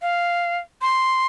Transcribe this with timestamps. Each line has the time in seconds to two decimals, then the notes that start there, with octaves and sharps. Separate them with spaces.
0.02 F5
0.82 C6